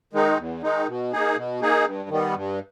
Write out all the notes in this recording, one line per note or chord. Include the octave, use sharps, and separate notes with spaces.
D#3 G#3 D#4
E2
D#3 G#3 D#4
B2
A#3 D#4 G#4
B2
A#3 D#4 G#4
G2
D#3 G3 B3
G2